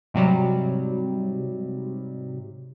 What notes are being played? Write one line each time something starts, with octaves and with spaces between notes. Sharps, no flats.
G#2 C3 F#3 G3